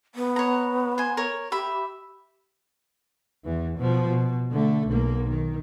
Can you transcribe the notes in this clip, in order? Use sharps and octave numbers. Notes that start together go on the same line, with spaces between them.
B3
C#5 A#5
C5 G#5
A#4 C#5
G4 E5 B5
E2 E3
B2 F3
B2
D3 A3
B1 A#3
D#3